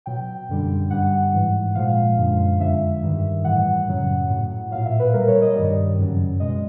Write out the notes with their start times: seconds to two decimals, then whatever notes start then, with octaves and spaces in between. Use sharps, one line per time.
0.06 B2 F#3 G5
0.49 F#2 D3 G3
0.90 G2 D3 G3 F#5
1.33 G#2 E3 G#3
1.75 A#2 F3 G#3 F5
2.17 F#2 D3 F3 G#3
2.59 F2 D3 F3 G#3 E5
3.03 G2 D#3 G3
3.44 A2 E3 G3 F#5
3.87 F#2 C#3 F#3
4.30 A2 F#3
4.71 A#2 F#3 F5
4.86 E5
4.99 B4
5.14 B2 G3 A#4
5.28 C#5
5.42 D#5
5.56 G2 D#3 G3 D5
5.98 F#2 C#3 F#3
6.40 B2 G#3 D#5